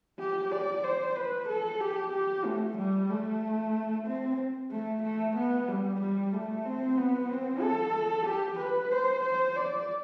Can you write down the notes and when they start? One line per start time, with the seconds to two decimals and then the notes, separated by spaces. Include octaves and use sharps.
0.19 G4
0.51 D5
0.84 C5
1.16 B4
1.48 A4
1.81 G4
2.13 G4
2.45 A3
2.78 G3
3.10 A3
4.07 C4
4.71 A3
5.03 A3
5.36 B3
5.68 G3
6.01 G3
6.33 A3
6.65 C4
6.97 B3
7.30 C4
7.62 A4
8.26 G4
8.59 B4
8.92 C5
9.24 C5
9.56 D5